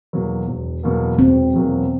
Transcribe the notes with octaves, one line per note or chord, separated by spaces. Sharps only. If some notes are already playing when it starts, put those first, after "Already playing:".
E2 B2 F#3 A#3
E1
E2 B2 F#3 A#3
E1 C4
E2 B2 F#3 A#3